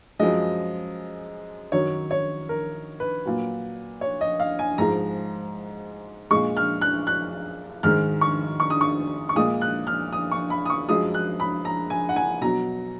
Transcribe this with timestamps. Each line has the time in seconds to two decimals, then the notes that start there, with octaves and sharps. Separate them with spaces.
0.19 F#2 F3 G#3 D#5
1.72 F#2 D#3 F#3 C#5
2.11 C#5
2.49 A#4
3.00 B4
3.25 A#2 F#3
4.01 C#5
4.21 D#5
4.40 F5
4.59 G#5
4.78 G#2 F3 G#3 A#5
6.31 A#2 G#3 C#6
6.57 F6
6.81 F#6
7.07 F#6
7.83 G#2 D#3 G#3 F6
8.21 C#6
8.60 C#6
8.70 D#6
8.81 C#6
9.29 C#6
9.36 A#2 G#3 D#6
9.61 F#6
9.87 F6
10.13 D#6
10.32 C#6
10.50 B5
10.66 D#6
10.70 C#6
10.89 F#2 F3 G#3 D#6
11.14 F#6
11.40 B5
11.65 A#5
11.90 G#5
12.09 F#5
12.16 G#5
12.42 B2 F#3 A#5